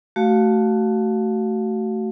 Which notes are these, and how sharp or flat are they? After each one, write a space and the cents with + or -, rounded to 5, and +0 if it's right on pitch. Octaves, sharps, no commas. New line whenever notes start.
A3 +0 F#4 +25 F5 +15